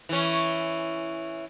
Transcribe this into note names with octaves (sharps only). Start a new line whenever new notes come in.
E3 C#4